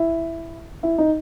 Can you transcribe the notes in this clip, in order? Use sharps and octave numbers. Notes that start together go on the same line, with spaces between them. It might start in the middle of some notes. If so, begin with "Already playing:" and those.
Already playing: E4
E4
D#4